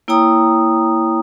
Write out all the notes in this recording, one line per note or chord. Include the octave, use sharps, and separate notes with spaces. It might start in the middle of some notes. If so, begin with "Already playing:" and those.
A#3 E4 C#5 G5 A#5 D#6